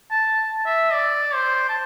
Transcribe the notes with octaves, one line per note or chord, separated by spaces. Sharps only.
A5
E5
D5
C5
A5